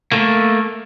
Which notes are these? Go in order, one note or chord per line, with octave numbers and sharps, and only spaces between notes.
A3 A#3